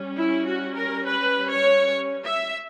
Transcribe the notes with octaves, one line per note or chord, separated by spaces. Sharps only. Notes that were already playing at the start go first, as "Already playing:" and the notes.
Already playing: G3 C#4
E4
F#4
A#4
B4
C#5
E5